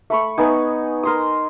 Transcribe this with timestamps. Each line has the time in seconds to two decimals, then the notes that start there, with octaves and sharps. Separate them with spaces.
0.10 A3 B5 C#6
0.38 B3 D#4 G#5
1.03 A#4 C6 D#6